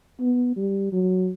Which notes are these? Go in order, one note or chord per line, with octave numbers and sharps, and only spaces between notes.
B3
G3
F#3